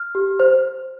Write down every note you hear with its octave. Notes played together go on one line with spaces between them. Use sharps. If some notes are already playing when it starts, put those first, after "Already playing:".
Already playing: F6
G4
C5